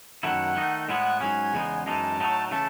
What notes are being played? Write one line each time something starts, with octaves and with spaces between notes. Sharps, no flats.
F#2 D#3 F#3 A3 E4 F#5
D#3 A3 D#4
A2 G#3 B3 E4 F#5
G#2 F#3 C#4 G#5
E2 C#3 G#3 B3 D#4
F#2 E3 G#3 D#4 A5
A2 F#3 A3 D#4
C#3 E3 A3 A5